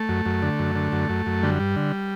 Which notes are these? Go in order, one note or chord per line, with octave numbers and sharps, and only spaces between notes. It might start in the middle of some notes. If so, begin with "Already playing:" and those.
Already playing: A3
F#2
F#2
D3
F#2
D3
F#2
F#2
F#2
D3 G3
G2
D3